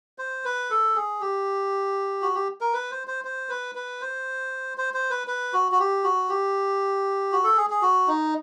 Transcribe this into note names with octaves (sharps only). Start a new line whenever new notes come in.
C5
B4
A4
G#4
G4
F#4
G4
A#4
B4
C5
C5
C5
B4
B4
C5
C5
C5
B4
B4
F#4
F#4
G4
F#4
G4
F#4
A4
G#4
G#4
F#4
D#4